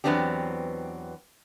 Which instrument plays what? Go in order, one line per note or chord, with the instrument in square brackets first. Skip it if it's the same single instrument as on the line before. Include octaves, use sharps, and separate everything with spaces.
[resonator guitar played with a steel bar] E2 F#3 B3 C4 D4 G4